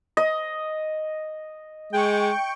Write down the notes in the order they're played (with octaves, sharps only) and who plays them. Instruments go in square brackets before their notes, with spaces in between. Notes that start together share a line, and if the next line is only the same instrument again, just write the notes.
[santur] D#5
[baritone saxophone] G#3 [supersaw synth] G5 C#6